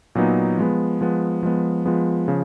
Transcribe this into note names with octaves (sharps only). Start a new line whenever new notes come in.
A#2 F#3 B3 D#4
F3 G#3 B3
F3 G#3 B3
F3 G#3 B3
F3 G#3 B3
C#3 F3